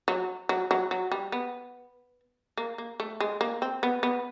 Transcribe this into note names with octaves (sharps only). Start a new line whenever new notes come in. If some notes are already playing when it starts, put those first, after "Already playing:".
F#3
F#3
F#3
F#3
G3
B3
A#3
A#3
A3
G#3
A#3
C4
B3
B3